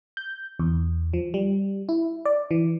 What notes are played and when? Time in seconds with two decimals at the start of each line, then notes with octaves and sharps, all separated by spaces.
0.17 G6
0.59 E2
1.13 F3
1.34 G3
1.89 E4
2.25 D5
2.51 E3